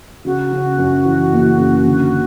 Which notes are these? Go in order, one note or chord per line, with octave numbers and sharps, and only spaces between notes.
C#3 F#4
C#3
F#2
E3
F#1
C#3
D3